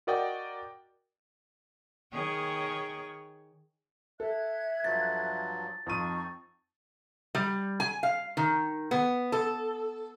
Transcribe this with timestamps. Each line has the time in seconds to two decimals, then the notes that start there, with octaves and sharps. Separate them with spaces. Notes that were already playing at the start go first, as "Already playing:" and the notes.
0.07 F#4 A#4 D5 D#5 F#5 G5
2.13 D#3 G#4 C#5
4.20 A4 E5 F#6 G#6
4.84 G2 F3 F#3 A6
5.87 F2 F3 C4 D#4 C#6 D#7
7.35 G3
7.80 G#5
8.03 F5
8.37 D#3
8.91 B3
9.32 A4